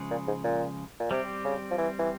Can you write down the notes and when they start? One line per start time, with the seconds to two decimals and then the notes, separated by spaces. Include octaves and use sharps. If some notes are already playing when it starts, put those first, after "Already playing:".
Already playing: C#3 F3 G#3
0.11 A#2
0.27 G#2
0.44 A#2
0.99 A#2
1.11 C3 G3 C4 G4
1.44 C#3
1.71 F3
1.78 E3
1.99 E3